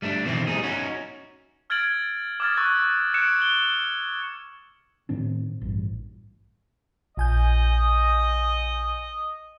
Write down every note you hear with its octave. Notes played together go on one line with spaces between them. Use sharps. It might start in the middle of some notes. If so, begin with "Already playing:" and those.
G3 A3 C4 D4
B2 D#3 E3 C4
G3 A3 B3 D#4 G#4
C#4 D#4 F#4
E6 F6 G#6 A6 D7 F#7
D6 D#6 F6 G#6 A6
C#6 E6 F#6 A6
E6 F#6 G#6 C#7 D7 E7
D7 F#7 G7
A2 D#3 C4 D4
A1 G2
A#1 D#5 G#5 G6